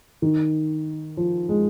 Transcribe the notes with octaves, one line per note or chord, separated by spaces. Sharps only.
D#3
F3
G#3